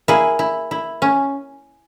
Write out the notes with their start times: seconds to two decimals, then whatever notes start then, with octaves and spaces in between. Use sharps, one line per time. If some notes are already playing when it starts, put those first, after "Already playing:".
0.08 A#3 E4 G#4
0.39 E4
0.71 E4
1.02 C#4